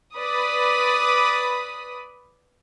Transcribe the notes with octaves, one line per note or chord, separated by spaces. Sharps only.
B4 D5 B5 D#6